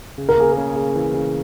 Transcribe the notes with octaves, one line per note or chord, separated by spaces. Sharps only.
C#3
A#4
A#3 G#4
C#3 A#4
C#3
E3
C#3